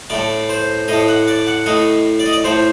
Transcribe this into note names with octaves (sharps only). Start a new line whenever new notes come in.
A2 A3 D5
C5
A2 A3 D#5
F#5
D5
F#5
A2 A3 D#5
D5
D#5
D5
A2 A3 C5